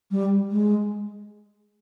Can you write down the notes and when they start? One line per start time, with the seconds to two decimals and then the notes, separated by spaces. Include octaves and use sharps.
0.11 G3
0.51 G#3